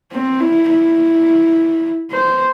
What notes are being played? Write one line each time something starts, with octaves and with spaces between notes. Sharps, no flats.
C4
E4
E4
C5